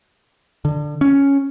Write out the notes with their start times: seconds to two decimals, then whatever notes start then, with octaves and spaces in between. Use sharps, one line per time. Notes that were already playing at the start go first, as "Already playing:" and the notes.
0.65 D3
1.01 C#4